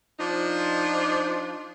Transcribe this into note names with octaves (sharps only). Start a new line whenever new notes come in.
F3 D4 D#4